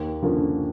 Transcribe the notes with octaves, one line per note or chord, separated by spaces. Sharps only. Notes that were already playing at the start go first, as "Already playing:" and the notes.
Already playing: D#2
D3 F3 A#3 C#4